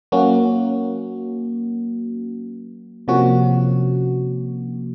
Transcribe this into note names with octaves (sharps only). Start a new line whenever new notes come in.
F#3 A#3 C#4 F#4
C3 F3 A#3 C#4 F#4